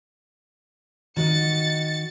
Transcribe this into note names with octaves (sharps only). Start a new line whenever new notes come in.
D#3 F#4 D#5 A6 C#7